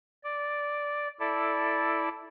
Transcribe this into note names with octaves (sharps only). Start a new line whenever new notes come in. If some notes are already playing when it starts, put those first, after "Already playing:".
D5
E4 A4 D5